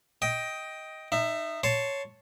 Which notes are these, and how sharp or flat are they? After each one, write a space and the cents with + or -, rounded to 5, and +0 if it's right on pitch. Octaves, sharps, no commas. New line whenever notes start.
D#5 +15 G5 +0
D#4 -20 E5 +10
C#5 +0 A5 +0 C6 +0